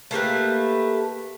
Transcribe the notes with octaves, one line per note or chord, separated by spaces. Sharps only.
A3 A#3 G4 B4